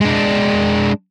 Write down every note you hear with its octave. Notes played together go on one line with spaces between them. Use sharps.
G#3 D4